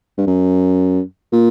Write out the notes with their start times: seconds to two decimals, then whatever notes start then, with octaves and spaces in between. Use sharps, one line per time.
0.18 G2
0.27 F#2
1.33 A#2